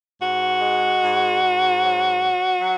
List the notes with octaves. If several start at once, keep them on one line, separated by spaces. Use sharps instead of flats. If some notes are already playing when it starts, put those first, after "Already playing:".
G#2 F#4
G#3
G#2
G#2
F#3
F#3
F#3